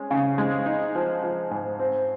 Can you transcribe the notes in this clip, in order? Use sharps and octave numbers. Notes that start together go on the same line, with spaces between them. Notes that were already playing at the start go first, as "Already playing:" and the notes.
Already playing: G#3 C#4
C#3
G#3
D#4
F3
F3
G#2
C4